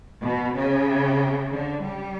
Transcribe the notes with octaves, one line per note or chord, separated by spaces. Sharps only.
B2
C#3
D3
G3